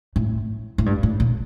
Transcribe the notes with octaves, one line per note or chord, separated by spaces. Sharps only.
A2
A2
G2
A2
A#2